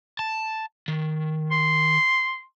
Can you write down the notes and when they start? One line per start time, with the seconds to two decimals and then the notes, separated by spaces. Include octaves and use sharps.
0.19 A5
0.88 D#3
1.51 C6